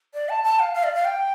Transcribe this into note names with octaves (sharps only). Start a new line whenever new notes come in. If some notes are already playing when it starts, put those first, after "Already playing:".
D5
A5
A5
F5
F5
D5
F5
G5